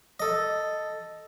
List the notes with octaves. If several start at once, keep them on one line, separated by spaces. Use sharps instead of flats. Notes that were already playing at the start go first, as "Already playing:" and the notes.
A4 D#5